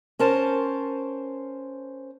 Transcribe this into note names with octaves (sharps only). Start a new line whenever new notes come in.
C#4 A#4 C5 A5